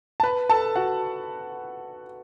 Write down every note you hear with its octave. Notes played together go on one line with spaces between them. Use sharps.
A5
B4 B5
A4 A5
F#4 F#5